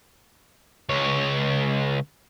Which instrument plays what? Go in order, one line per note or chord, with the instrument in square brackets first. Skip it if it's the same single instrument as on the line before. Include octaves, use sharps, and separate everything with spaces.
[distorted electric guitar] C#2 C#5